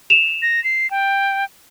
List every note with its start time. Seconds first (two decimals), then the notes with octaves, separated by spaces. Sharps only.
0.10 E7 F7
0.42 A#6
0.64 C7
0.91 G5